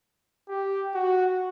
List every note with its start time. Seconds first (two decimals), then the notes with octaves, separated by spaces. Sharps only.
0.49 G4
0.94 F#4